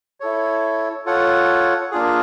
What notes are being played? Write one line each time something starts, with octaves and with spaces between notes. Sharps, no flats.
E4 A4 C#5
F4 A4 C#5 F#5
A#3 D4 F4 G#4